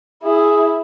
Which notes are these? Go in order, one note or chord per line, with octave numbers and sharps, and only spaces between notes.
E4 G#4